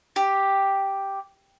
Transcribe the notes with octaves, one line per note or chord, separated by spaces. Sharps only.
G4